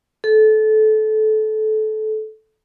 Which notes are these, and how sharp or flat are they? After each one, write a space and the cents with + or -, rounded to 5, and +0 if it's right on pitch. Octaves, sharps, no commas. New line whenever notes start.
A4 -20